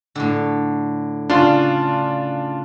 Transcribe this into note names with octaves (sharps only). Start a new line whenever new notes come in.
A2 D3
C#3 D4 F4 C6